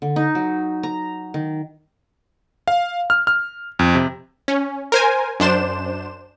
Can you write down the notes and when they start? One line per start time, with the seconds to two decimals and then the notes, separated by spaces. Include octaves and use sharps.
0.02 D3
0.16 D#4
0.35 F#3
0.83 A#5
1.34 D#3
2.68 F5
3.10 F6
3.27 F6
3.79 F2
3.95 C3
4.48 C#4
4.92 A#4 C5 G#5
5.40 F#2 D4 C5 E7